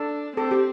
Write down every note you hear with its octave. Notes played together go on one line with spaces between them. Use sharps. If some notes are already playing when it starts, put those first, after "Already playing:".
Already playing: D4 A4
C4 A4
G4